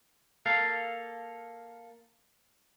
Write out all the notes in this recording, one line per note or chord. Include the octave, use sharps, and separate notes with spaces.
A#3 A4 F5